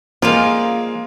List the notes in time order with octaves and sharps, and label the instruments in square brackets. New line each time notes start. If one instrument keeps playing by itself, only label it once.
[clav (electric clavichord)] F3 G#3 [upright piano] A#3 [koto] F4 D5 F5